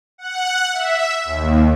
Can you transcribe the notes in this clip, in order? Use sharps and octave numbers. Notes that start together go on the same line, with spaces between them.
F#5
E5
D#2